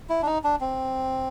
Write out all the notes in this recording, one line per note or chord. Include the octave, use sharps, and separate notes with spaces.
E4
D4
D#4
D4
C4